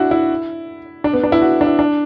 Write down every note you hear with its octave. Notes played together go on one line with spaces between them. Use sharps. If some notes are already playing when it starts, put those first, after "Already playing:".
Already playing: D4 E4 F#4
E4
D4
B3
D4
E4
F#4
D4
E4
D4